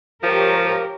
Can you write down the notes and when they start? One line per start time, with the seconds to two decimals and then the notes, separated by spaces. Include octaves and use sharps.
0.23 F3 G4 A#4 C#5